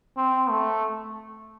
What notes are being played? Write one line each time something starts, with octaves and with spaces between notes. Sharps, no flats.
C4
A3